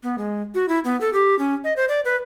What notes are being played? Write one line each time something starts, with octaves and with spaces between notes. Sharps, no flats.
B3
G#3
F#4
E4
B3
A4
G4
C#4
D#5
C5
D5
B4